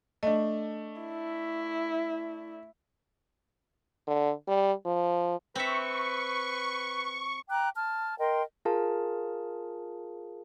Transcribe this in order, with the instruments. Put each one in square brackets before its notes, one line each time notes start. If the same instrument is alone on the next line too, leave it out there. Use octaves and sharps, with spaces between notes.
[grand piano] A3 D4 [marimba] D#5
[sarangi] E4
[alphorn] D3
G3
F3
[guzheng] C4 E5 [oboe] B4 [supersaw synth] C#6
[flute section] G5 A#5 D6 F#6
A5 F6
A#4 D#5 G5 C6
[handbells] F4 G#4 A#4 F5 A5